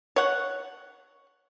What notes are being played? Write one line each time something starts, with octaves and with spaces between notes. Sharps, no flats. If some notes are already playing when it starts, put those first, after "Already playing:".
C#5 F#5